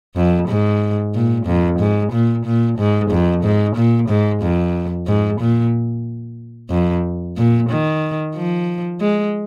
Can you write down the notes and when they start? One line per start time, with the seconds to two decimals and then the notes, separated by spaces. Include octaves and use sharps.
0.16 F2
0.48 G#2
1.15 A#2
1.46 F2
1.80 G#2
2.12 A#2
2.46 A#2
2.78 G#2
3.11 F2
3.44 G#2
3.76 A#2
4.09 G#2
4.42 F2
5.07 G#2
5.41 A#2
6.70 F2
7.37 A#2
7.70 D#3
8.35 F3
9.01 G#3